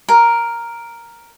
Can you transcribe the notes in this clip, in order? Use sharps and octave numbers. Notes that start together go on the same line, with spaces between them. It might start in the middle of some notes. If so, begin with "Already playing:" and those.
A#4